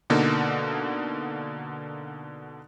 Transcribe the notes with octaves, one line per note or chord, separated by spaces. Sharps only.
B2 D3 A#3 D#4